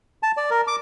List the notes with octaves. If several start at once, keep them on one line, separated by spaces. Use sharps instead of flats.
A5
D5
A#4
D6